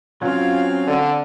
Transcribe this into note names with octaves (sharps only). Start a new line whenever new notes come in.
F#3 C4 C#4 F4 F5
D3